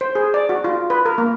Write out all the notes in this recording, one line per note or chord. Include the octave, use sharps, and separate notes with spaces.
C5
G#4
D5
F#4
F4
B4
A#4
A#3